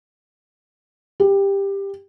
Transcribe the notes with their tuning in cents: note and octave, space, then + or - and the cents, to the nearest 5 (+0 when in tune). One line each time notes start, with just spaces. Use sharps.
G4 +15